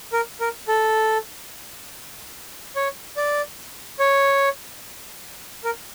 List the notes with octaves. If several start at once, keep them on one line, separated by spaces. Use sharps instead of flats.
A#4
A#4
A4
C#5
D5
C#5
A#4